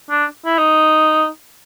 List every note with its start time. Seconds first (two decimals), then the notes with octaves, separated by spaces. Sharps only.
0.10 D4
0.45 E4
0.58 D#4